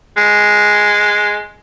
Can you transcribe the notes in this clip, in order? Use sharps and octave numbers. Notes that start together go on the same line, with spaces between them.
G#3